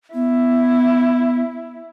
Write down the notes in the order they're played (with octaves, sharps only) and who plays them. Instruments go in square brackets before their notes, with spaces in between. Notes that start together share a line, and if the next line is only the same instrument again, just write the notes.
[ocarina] B3 [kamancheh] E4